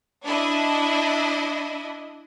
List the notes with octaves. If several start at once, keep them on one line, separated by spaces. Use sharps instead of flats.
D4 E4 D#5